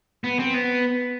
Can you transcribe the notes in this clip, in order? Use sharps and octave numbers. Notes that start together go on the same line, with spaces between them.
B3
C4
B3